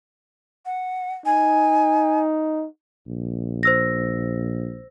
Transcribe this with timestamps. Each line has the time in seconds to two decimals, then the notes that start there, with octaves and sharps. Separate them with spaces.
0.66 F#5
1.26 D#4 G#5
3.07 A#1
3.63 C5 E6 A#6